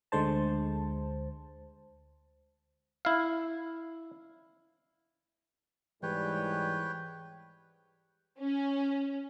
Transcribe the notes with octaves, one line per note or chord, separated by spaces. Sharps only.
D2 D3 G#3 C5 A5
E4 F5
G#2 E3 G3 B4 C#5 G5
C#4